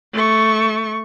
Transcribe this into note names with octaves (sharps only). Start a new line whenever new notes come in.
A3 C#6